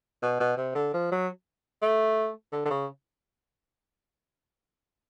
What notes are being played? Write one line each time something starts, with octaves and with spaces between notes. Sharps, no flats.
B2
B2
C3
D3
F3
F#3
A3
D3
D3
C#3